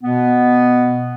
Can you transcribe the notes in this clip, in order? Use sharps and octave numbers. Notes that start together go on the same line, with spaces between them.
B2 B3